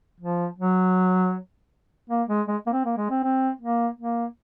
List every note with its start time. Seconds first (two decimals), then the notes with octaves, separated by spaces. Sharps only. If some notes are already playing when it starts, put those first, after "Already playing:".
0.20 F3
0.58 F#3
2.10 A#3
2.28 G#3
2.48 G#3
2.67 A#3
2.73 C4
2.85 A#3
2.98 G#3
3.11 C4
3.24 C4
3.61 A#3
3.99 A#3